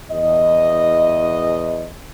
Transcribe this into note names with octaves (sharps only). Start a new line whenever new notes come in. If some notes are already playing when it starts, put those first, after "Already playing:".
E2 D#5